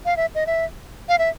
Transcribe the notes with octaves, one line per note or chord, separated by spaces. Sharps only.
F5
E5
D#5
E5
F5
E5